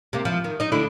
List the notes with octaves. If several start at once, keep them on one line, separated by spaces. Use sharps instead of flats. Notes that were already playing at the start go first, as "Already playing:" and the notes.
C3 A#3
F3 E4
D#3
D#4 D#5
D2 D3 E4